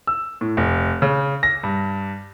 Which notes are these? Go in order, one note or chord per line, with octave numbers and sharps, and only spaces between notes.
E6
A2
F1
C#3
A#6
G2